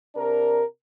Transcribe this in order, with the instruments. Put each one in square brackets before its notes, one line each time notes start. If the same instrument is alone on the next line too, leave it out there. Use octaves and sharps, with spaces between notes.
[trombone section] C3 D4 A#4